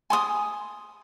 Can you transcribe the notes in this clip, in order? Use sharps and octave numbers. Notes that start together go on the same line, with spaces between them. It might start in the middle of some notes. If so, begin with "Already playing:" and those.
G#5 C6 D#6